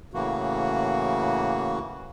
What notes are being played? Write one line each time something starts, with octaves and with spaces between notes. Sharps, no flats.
A2 C#3 E3 A#3 F#4